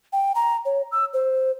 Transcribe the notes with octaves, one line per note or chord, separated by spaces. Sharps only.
G5
A#5
C#5
E6
C5